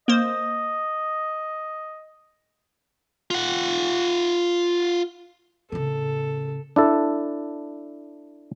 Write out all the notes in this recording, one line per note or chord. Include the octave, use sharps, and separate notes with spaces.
A#3 C5 D#5
F4 F#5
A2 C#3 A4
D4 E4 A4